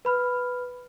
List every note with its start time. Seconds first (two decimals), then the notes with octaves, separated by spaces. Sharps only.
0.05 B4 B5 F6